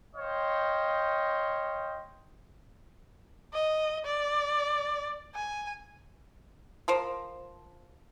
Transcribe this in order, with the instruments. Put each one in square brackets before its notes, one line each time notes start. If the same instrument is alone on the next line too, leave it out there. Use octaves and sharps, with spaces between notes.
[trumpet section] C5 C#5 D#5 F5 G5
[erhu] D#5
D5
G#5
[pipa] F3 A#4 C5